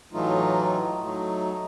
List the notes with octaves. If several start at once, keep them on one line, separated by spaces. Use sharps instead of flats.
A2 E3 F#3 A3 D#4 F4
F#3 A3 D#4